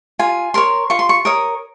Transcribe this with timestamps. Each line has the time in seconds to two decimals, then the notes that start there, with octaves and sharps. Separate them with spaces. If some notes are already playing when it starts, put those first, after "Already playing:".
0.19 F4 G#5
0.54 A#4 C#5 C6
0.90 F4 C#6
0.99 C6
1.09 C#6
1.25 A#4 C#5 D#6